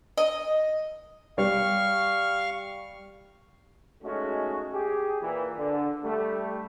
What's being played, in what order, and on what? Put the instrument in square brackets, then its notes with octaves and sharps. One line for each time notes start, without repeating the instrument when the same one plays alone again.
[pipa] D#5
[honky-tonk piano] G3 [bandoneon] F5 C#6 F6
[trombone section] G#3 A3 C#4 D#4 F#4
G4 G#4
A#2 E3
D3
G3 A3